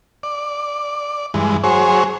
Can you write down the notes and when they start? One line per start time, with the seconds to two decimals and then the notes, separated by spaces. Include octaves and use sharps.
0.23 D5
1.34 G2 E3 G#3
1.64 F#3 G#4 C5 C#5